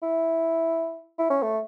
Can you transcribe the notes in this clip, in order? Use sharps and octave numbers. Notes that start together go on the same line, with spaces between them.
E4
E4
C#4
A3